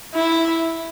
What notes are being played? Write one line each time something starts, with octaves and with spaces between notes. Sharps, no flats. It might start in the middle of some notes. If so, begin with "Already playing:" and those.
E4